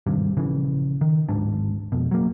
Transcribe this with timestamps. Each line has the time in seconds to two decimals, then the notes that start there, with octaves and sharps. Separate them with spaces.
0.06 D#1 G#1 G2 C3
0.37 A#1 C#3 E3
1.01 D#3
1.29 D1 G#1 G#2 D4
1.92 F2 B2
2.11 F#3 A#3